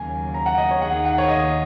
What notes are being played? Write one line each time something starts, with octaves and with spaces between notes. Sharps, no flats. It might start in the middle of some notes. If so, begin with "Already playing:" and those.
Already playing: D#2 C#3 F#3 A#3 G#5
A#5
F#5
D#5
C#5
D#2 D#3 A#3 D#4 G#4 F#5
F#5
C#5
D#5